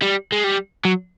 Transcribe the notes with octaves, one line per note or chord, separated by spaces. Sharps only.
G3
G#3
G3
F#3